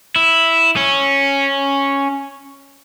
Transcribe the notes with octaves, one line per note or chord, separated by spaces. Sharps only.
E4
C#4